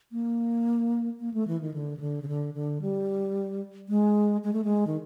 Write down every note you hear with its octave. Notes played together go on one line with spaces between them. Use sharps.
A#3
A#3
A3
E3
D#3
D3
C#3
D3
C#3
D3
D3
G3
G#3
G#3
A3
G#3
D#3